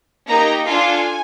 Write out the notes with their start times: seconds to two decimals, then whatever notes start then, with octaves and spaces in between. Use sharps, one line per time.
0.27 A#3 D#4 G4 A#5
0.65 D4 F4 A4 G#5